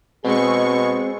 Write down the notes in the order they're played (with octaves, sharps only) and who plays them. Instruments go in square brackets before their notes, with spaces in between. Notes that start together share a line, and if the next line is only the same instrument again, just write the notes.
[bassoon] B2 [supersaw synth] G#3 C#6 [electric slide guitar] C4 [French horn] G#4